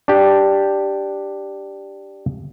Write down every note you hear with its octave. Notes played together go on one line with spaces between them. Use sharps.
D4 G4